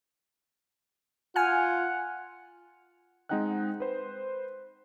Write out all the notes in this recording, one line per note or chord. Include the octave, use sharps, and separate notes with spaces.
F4 F#5 G#5 F6
G#3 C4 D#4 F#5 G5 F#6
B4 C5